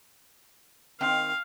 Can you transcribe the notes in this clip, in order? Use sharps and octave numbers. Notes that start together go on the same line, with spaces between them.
D#3 C4 F5 G5